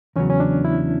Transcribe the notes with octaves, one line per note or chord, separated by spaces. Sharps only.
E2 C#3 F#3 C#4
C#4
D4
E4